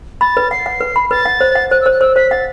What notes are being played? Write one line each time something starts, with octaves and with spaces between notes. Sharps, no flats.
B5 A6
B4
F#5 C7
F#5
B4
B5
B4 A6
F#5
C5
F#5
C5 F#6
E6
C5
F#6
C5 E6
C5 B6
F#5 A6